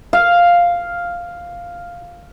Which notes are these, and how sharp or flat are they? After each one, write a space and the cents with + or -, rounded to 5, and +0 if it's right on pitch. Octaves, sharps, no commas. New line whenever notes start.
F5 +0